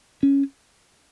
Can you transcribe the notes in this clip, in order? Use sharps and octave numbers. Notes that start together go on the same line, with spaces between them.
C#4